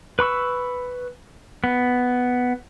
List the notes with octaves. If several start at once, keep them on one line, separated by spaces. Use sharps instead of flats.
B4 B5 C#6 E6
B3